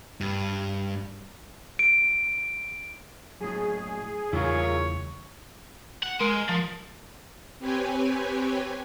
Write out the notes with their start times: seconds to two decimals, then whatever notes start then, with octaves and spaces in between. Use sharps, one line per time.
0.21 G2
1.79 D7
3.40 F#2 A2 G#4
4.33 E2 C#3 G3 E4 F4 A#4 C#5
6.03 F#5
6.21 G#3 A#4
6.49 F3
7.59 C4 G4 B4 C#5 G#5